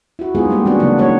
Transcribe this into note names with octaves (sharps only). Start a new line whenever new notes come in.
E4 F#4
G#3 B3 D#4 F4 G#4
G3 A#3 C4 G4
E3 B3 C4 D4 F#4 G#4
C#3 F#3 A#3 D4
G#3 A#3 D#4 F#4 C#5